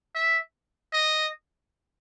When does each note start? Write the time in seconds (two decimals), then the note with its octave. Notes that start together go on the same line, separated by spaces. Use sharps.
0.15 E5
0.93 D#5